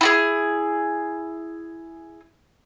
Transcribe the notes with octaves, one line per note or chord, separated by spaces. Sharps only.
E4 F#4 G#4